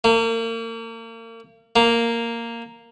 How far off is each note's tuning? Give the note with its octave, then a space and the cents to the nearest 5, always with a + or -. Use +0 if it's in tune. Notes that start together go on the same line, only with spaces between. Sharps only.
A#3 -35
A#3 -5